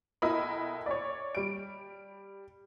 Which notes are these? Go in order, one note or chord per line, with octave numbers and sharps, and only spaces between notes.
B1 E4 A#4 D#5 B5
C#5 D5
G3 D7